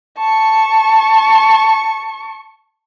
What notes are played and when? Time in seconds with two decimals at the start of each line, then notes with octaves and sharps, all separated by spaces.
0.18 A5 C#6